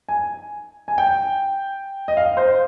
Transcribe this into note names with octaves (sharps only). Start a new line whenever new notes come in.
G#5
G#5
G5
D#5
F5
C5